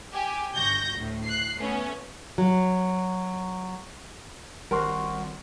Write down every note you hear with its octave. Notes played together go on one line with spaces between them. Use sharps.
G4 G#5
G1 F#4 G6 A#6
D2 A2
F#6 C7
A3 B3 C#4
F#3
G#1 G3 F#4 A#4 C5